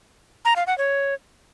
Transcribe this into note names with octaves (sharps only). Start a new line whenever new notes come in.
A#5
F5
F#5
C#5